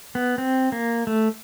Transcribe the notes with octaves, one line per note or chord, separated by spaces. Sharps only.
B3
C4
A#3
A3